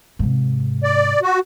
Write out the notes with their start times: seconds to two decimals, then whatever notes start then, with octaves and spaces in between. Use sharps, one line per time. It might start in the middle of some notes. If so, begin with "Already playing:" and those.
0.19 G#2 C3
0.84 D5
1.23 F#4